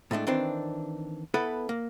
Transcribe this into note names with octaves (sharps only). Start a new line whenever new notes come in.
A2 G#3 A3 D4
D#3 E3 C4 D4
B3 E4 A4 B4
A#3